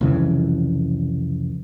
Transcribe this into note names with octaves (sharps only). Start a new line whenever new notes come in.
C2 F2 C#3 E3